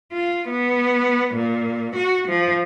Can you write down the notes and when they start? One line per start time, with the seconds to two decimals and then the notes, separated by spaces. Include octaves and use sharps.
0.12 F4
0.49 B3
1.35 A#2
1.96 F#4
2.28 F3